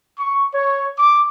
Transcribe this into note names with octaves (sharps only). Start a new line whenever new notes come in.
C#6
C#5
D6